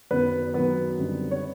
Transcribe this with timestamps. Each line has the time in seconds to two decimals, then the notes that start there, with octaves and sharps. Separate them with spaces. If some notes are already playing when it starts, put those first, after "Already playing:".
0.11 F#2 D#3 F#3 B3 B4
0.54 F#2 D#3 F#3 B3 B4
0.98 F#2 D3 G3 C4 D#4
1.31 C#5